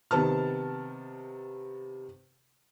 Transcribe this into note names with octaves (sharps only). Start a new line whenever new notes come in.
C3 D#3 B3 A5 F6